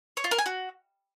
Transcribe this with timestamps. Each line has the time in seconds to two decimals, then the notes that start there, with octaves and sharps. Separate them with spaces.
0.17 C#5
0.24 F4
0.31 A#4
0.39 G#5
0.46 F#4